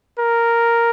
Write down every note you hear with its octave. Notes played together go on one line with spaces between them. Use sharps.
A#4